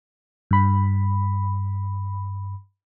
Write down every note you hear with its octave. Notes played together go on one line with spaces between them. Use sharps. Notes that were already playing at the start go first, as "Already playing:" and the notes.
G2 B5